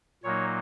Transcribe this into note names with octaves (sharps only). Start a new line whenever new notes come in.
A#2 F#3 A#3 D#4 C#5